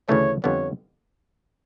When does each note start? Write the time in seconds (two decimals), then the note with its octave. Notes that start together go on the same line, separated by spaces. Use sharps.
0.08 D2 C#3 E3 A3 C#4 C#5
0.44 F2 D3 G3 B3 C#5